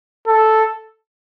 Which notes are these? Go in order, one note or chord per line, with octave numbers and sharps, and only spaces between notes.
A4